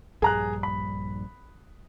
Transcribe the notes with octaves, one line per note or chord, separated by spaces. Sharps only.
A#1 G2 G3 G#4 A#5 F#6
B5